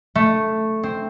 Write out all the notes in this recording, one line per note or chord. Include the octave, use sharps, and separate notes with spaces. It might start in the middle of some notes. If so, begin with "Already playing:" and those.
A3
C4